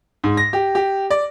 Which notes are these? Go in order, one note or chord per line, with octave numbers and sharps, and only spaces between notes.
G#2
A#6
G4
G4
D5